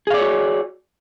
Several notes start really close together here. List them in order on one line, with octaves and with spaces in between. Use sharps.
G#4 F5 D5 C#5 F#4